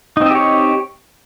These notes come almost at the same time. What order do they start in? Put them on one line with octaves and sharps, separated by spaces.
D#4 C4 D#5 G4 C#5